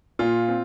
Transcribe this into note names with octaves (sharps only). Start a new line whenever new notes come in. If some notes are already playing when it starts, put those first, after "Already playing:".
A#2 F4
C4